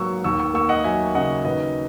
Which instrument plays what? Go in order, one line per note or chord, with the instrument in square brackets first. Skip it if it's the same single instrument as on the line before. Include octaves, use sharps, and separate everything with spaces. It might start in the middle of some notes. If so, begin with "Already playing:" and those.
Already playing: [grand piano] G#2 F#3 A#3 C#6 E6
D#2 C#6 E6
C#6 E6
A#3 C#6 E6
D#5 F#5
F#3 E5 G#5
C#3 D#5 F#5
D#2 B4 D#5